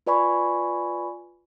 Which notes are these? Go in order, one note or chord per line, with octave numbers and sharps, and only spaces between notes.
F4 B4 D5 G#5 B5 C#6